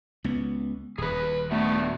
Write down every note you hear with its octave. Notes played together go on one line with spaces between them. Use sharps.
C#2 B3
D#1 G#4 B4
A3 B3 D4 F#4